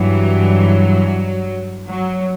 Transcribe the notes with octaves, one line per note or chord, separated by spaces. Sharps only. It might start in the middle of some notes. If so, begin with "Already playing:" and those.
Already playing: G2 E3 F#3
F#3